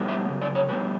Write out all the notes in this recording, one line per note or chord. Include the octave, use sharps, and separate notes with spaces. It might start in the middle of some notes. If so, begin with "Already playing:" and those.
Already playing: B2 G3 B3
E5
F#2 C#3
D5
C#5
B2 G3 B3 B4